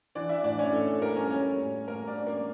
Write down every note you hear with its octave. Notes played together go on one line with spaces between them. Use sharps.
E3 D4 D5
E4 E5
A2 D4 D5
C#4 C#5
A2 A4
A4
G3 A#3 A#4
C#4 C#5
G3 C#4 C#5
A2
A2 A#3 A#4
D4 D5
C#4
A#3 A#4